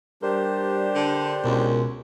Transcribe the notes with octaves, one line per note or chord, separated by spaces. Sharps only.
G3 D4 G4 A#4 C5
D3
C#2 B2 F#4 A#4